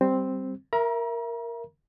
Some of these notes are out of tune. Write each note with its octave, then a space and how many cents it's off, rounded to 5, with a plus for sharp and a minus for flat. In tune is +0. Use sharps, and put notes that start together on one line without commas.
G3 +0 C4 +0
A#4 +0 E5 +20 A#5 +35